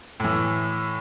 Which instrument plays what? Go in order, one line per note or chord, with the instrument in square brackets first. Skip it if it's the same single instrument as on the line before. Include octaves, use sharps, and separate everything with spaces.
[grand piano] A2 E3